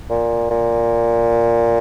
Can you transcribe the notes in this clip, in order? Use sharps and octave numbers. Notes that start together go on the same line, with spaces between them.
A#2
A#2